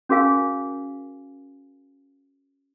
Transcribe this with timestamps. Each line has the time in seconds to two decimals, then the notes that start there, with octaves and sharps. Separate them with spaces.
0.09 C#4 F#4 G#4 A#4 F5 G#5